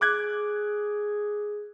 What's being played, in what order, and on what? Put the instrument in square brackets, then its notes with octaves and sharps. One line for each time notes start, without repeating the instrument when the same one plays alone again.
[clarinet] G#4 [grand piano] D6 F#6 G#6